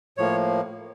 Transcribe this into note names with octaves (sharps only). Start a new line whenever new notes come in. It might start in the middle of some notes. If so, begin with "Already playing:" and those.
A2 F3 A#3 C#5